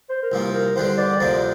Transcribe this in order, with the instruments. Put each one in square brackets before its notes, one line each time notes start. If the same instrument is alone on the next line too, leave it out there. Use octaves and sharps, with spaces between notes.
[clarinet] C5
A#4
[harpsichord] C2 A#2 F3 A#3 [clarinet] C5
[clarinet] A#4
[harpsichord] E2 D3 G3 D4 [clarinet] C5
[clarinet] D5
[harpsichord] D2 C3 F3 A#3 D4 [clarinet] C5